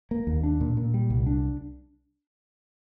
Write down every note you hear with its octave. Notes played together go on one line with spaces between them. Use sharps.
A#3
D#2
D4
A#2
A#2
G3
C2
D4